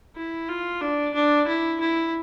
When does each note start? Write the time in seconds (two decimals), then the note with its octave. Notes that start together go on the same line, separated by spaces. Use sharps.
0.15 E4
0.48 F4
0.80 D4
1.14 D4
1.47 E4
1.80 E4